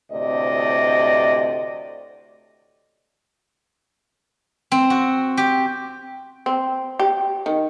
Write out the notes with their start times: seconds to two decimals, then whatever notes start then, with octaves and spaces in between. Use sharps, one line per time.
0.11 D2 A2 C3 D5 D#5
4.72 C4
4.90 F#4
5.37 G4
6.46 C4
6.99 G4
7.46 D#3